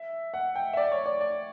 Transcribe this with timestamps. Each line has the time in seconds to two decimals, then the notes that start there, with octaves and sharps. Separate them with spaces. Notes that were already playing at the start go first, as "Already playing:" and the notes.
Already playing: E5
0.34 F#5
0.56 G5
0.73 E5
0.77 D5
0.92 C#5
1.06 D5
1.21 D5